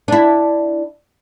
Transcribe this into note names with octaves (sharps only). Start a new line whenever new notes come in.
D4 E4